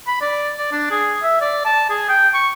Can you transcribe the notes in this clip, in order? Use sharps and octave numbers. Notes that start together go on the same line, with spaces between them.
B5
D5
D5
D4
G#4
E5
D5
A5
G#4
G5
C#6